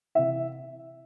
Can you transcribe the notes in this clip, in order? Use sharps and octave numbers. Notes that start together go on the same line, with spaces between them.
C3 E3 E5